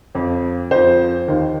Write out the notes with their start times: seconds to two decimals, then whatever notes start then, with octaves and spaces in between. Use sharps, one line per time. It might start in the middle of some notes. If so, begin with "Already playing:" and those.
0.15 F2 F3
0.71 F2 F3 C5
1.28 D#2 D#3